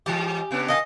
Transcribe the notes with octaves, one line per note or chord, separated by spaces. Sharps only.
G#2 E3 G#3 G4
C#3 B3 D4
D#3 D#5 F5 G#5